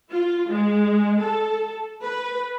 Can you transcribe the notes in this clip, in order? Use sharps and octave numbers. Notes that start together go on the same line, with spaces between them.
F4
G#3
A4
B4